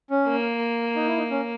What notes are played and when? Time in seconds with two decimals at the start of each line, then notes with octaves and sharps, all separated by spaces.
0.10 C#4
0.27 A#3
0.96 D#4
1.07 E4
1.18 D#4
1.31 C#4